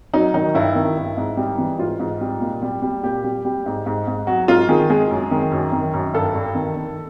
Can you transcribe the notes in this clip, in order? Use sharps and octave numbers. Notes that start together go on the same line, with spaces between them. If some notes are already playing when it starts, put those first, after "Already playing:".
F#3 D#4
D#3 D#4
G2 E4
D#3
G2
G#2
G3
E3
G#2 F4
G#2
G3
A#2
G3
G3
A#2 G4
G3
G3
G#2
G#2
G#2
F#3 F#4
G#2 F4
D#3 G#4
G#3 G#4
F#2
D#3
F#2
D#3
F#2
G2 A4
G2
D#3
D#3